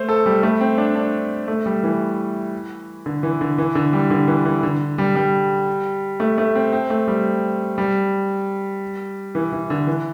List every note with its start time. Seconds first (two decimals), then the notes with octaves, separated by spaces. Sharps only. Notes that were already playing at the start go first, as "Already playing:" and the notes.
Already playing: A3 C5
0.09 A4
0.26 G3
0.43 A3
0.61 C4
0.78 D4
0.95 D4
1.48 A3
1.66 G3
1.83 E3
3.06 D3
3.23 E3
3.41 D3
3.58 E3
3.75 D3
3.93 G3
4.10 D3
4.28 E3
4.45 E3
4.63 D3
4.98 G3
5.15 G3
6.20 A3
6.38 A3
6.55 C4
6.73 C4
6.90 A3
7.07 G3
7.78 G3
9.35 E3
9.52 E3
9.70 D3
9.87 E3